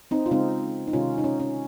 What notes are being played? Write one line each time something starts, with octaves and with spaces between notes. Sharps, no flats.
C4 D#4
F4
C#3 G#3 C4 D#4
D#4
C3 D#3 G#3 C#4 F4
D#4
C#4
C#4